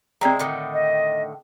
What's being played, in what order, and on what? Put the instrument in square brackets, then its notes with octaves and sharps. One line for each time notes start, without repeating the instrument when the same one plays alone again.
[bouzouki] C3 G#3 [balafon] C4 D5 A#5
[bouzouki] A2 D3 D#3
[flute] D#5